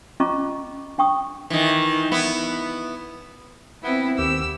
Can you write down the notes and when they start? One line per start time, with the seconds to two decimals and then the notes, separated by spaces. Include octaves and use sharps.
0.20 C#4 F4 D#5 A#5 C#6 D6
0.98 D4 G5 C#6 D#6
1.50 D#3 E3
2.12 B3 E4
3.84 B3 C4 E4
4.18 D#2 G4 E6